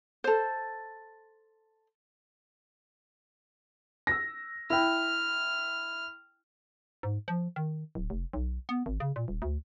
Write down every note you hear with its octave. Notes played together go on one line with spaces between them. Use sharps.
A4 C5
E6 A#6
E4 G5 F6
G#2
F3
D#3
D1
F1
B1
B3
G#1
C#3
A#2
D#1
D2